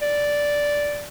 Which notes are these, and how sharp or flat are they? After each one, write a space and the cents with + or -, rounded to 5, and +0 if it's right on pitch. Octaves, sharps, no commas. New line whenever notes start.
D5 -5